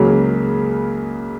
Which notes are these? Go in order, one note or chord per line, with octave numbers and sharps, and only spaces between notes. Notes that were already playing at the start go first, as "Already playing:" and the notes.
Already playing: C#2 C#3 F#3 A#3